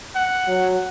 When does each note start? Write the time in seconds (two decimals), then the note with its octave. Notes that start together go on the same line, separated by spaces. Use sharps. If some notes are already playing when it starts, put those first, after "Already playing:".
0.15 F#5
0.48 F#3